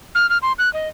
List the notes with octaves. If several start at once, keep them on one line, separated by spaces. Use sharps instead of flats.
F6
F6
C6
F#6
D#5